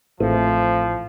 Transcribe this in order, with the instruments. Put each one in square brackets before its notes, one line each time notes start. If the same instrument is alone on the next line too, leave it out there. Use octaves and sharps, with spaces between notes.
[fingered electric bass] A1 [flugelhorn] F3 [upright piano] A3 C4 E4